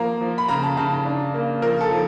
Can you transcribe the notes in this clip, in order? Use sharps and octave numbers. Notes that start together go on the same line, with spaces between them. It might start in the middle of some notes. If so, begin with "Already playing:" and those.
Already playing: F3 A#3 A#5
F3
B5
C#3 A#5
A5
C#3 A5
D4
A#3
F3 A#4
A4
F3